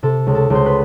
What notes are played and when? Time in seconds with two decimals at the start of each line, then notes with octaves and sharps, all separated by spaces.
0.03 C3 A4
0.27 C#2
0.35 A4
0.50 C#2
0.55 C5
0.66 B4